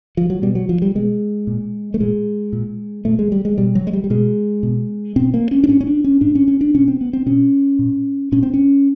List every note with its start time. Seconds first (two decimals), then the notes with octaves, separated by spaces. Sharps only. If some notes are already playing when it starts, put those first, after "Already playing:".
0.17 F3
0.30 F#3
0.42 B2 G3
0.55 F#3
0.69 F3
0.82 G3
0.95 B2 G#3
1.47 A#2
1.94 A3
2.00 A#2 G#3
2.53 A#2
3.05 A#2 A3
3.19 G#3
3.32 G3
3.45 G#3
3.58 B2 G3
3.75 F#3
3.87 G#3
3.93 G3
4.04 G3
4.10 B2 G#3
4.63 B2
5.16 B2 C4
5.34 A#3
5.51 C#4
5.64 D4
5.68 A2 C#4
5.81 C#4
5.87 D4
6.04 C#4
6.21 A2 D4
6.35 C#4
6.48 C#4
6.61 D4
6.74 B2 C#4
6.88 C4
7.01 B3
7.13 C4
7.26 B2 C#4
7.79 A#2
8.32 A#2 C#4
8.43 C4
8.54 C#4